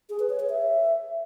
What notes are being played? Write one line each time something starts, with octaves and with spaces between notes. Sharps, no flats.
G#4
B4
C#5
C#5
E5